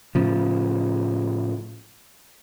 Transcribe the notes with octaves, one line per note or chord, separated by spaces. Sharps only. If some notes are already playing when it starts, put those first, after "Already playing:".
A2 C#3 F3